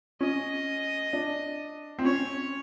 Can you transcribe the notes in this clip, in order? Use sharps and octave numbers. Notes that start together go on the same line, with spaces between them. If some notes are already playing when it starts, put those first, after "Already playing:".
C#4 D#5
D4
C4
C#4 C#5